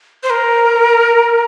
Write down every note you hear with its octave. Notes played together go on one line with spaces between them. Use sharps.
C5
A#4